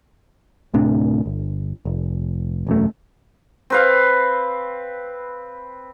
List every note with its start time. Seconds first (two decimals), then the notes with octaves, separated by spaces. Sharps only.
0.74 D1 A2 C3 D4
1.26 G1
1.85 F1
2.67 E1 F#2 A3
3.70 C4 B4 F5